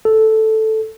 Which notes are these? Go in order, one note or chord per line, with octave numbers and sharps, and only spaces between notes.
A4